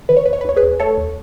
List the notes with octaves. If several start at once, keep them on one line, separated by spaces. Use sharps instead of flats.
D#3 B4
C#5
D#2 B4
C#5
B4
D#2 C#5
G#4 B4
D#2
A3 A4 C#5
D#2